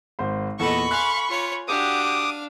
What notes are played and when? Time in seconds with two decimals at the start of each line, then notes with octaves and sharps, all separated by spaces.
0.19 G#1 C5 C6
0.59 E2 A#2 A4 D#5 B5 C#6
0.91 F5 G#5 C6 F#6
1.29 F4 C#5
1.68 D4 F#4 G4 F5 D6 D#6